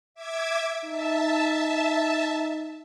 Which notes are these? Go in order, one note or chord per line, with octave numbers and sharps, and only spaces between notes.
E5 D6 G#6
D#4 E5 A5